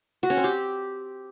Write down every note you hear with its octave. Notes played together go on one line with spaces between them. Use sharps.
F#4
C#4
C4
G4